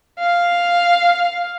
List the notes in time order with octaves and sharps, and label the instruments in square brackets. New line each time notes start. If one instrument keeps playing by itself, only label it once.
[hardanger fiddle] F5